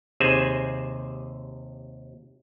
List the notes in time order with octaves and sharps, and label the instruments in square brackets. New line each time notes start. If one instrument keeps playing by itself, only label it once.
[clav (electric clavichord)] D#2 C3 G#4 C5 G#5